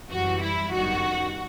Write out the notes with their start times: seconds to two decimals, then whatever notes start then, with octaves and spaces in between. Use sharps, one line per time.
0.10 F#2 E3 G3 F#4
0.41 E4
0.72 G1 F#2 D#3 G3 F#4